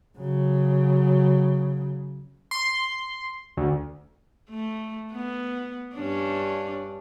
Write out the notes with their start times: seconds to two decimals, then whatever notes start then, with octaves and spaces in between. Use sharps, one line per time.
0.18 C#3 F#3
2.51 C6
3.57 D2
4.50 A3
5.13 B3
5.96 G2 C#4 D4